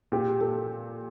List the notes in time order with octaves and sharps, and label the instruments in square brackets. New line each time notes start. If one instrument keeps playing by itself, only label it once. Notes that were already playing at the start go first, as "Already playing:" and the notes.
[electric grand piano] A#2 [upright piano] G4
[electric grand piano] A#2 [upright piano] A4